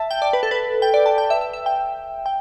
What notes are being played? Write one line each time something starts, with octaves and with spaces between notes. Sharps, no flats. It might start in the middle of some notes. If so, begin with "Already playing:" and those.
Already playing: E5 A5
G5
D5
B4
A4
B4
G5
D5
A5
G5
E5
E5
E5
G5
G5